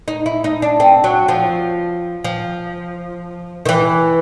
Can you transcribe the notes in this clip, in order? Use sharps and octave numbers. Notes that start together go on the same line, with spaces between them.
D#4
E4
D#4
D4
C4
F#3
F3
F3
D#3
E3